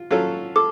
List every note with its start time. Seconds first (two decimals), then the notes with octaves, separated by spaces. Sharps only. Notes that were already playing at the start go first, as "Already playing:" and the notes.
Already playing: F4
0.11 F#3 C#4 F4 A4
0.56 A4 D6